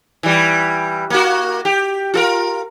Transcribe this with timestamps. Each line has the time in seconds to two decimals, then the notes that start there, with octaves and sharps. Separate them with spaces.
0.23 E3 G3
1.10 A#3 F#4
1.65 G4
2.14 F4 A4 A#4